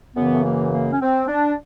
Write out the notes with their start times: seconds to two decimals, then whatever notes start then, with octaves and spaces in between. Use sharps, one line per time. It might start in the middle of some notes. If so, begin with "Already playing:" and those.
0.15 F#2 C#3 E3 B3
0.34 A3
0.43 A#3
0.72 A#3
0.92 C#4
1.00 C4
1.28 D4